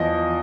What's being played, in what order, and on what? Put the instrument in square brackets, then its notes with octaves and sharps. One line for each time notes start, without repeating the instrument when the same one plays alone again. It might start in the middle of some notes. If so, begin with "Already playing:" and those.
Already playing: [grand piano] E2 F3 D#5